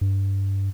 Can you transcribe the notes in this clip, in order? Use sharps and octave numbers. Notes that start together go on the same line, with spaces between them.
G2